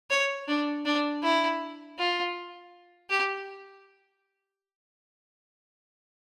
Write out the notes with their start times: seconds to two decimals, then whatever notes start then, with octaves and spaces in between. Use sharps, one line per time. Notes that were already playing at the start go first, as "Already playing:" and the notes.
0.10 C#5
0.48 D4
0.85 D4
1.23 E4
1.98 F4
3.10 G4